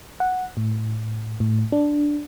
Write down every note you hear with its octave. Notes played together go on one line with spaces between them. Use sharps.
F#5
A2
A2
D4